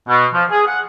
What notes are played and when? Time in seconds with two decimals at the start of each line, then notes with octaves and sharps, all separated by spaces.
0.08 B2
0.33 F3
0.50 G#4
0.66 F#5